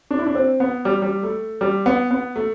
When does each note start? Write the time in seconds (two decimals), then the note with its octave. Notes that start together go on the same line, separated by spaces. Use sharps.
0.11 D4
0.19 E4
0.27 D4
0.35 C4
0.60 B3
0.85 G3
1.02 G3
1.23 A3
1.61 G3
1.86 B3
2.11 B3
2.36 A3